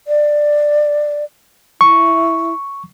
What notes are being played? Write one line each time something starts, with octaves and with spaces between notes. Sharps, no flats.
D5
E4 C#6